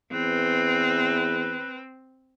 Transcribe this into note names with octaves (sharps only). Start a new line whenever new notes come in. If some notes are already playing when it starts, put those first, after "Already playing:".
E2 C4 B4